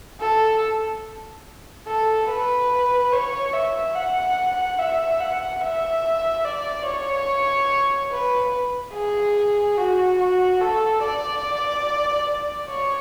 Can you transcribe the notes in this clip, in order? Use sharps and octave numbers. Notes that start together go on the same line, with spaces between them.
A4
A4
B4
C#5
E5
F#5
E5
F#5
E5
D5
C#5
B4
G#4
F#4
F#4
A4
D5
C#5